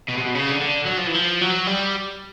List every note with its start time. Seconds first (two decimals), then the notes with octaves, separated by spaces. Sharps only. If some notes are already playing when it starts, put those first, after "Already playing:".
0.09 B2
0.18 C3
0.21 B2
0.35 C#3
0.49 D3
0.61 D3
0.85 F#3
0.97 F3
1.06 E3
1.14 F3
1.41 F#3
1.67 G3